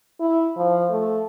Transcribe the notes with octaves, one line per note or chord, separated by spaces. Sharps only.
E4
F3
A3